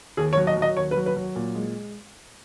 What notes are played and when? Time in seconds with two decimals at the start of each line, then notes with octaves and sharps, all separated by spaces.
0.17 D#2 G#4
0.33 C#5
0.37 F#3
0.47 D#5
0.57 F#3
0.62 D#5
0.77 D#2 C#5
0.91 B4
0.97 F#3
1.06 B4
1.16 F#3
1.35 A#2
1.55 G#3